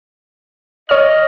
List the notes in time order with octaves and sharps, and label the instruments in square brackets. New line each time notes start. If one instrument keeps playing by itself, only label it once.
[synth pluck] C#5 F6 [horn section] D#5